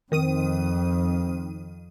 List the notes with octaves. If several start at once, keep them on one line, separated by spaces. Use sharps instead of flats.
F2 D#3 C4 D#6 D#7